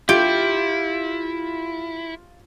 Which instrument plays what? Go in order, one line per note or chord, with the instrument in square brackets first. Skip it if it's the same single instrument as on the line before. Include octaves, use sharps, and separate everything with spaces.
[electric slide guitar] E4 [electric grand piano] F4 G6 D7 [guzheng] G4